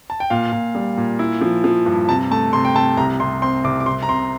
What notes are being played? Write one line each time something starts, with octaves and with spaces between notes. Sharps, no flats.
A5
G5
A#2 F5
A#2
G3
A#2
E4
F3
F3
G2
C3 A5
A3 A5
C3 C6
G5
C3 A5
C2 A#5
C2 C6
C4 C6
C2 D6
D6
C2 C6
A#5
C3 C6